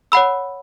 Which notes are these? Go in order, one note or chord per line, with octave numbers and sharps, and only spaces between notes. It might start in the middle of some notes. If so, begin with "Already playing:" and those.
C#5 F#5 B5 E6